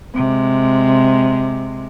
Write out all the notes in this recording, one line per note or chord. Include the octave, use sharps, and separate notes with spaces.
C3 G#3